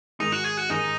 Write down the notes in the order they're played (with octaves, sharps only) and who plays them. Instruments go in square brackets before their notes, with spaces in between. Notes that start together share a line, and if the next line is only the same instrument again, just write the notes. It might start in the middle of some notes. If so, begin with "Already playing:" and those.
[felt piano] G#2 D#3 G#3 [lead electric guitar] D#4
[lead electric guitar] F#4
G#4
F#4
[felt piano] G#2 D#3 G#3 [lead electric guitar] D#4